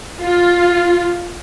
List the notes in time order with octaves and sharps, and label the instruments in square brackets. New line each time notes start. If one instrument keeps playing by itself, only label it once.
[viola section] F4